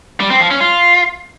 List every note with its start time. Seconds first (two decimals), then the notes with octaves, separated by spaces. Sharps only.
0.20 G3
0.30 C4
0.40 F3
0.50 C#4
0.60 F4